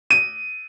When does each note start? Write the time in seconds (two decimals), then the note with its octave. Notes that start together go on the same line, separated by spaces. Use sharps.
0.10 D#7